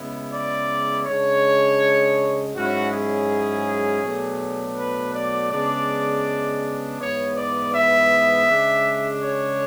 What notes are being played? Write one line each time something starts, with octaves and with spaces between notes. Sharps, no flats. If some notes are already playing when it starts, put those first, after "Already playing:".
Already playing: C#3 G#3 B3 E4
D5
C#3 G#3 D4 C#5
G#2 F#3 C#4 E4 F#4
G#4
B2 F#3 A3 D4
B4
D5
C#3 G#3 B3 D4 D5
G#2 E3 B3 C#5
D5
E5
C#3 G#3 D4
C#5